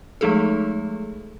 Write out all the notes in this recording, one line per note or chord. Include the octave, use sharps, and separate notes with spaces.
F3 G#3 A3 D#4 G#4 A4